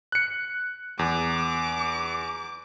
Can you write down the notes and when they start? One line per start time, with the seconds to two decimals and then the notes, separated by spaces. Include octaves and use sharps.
0.12 F#6 C#7
0.99 E2 D6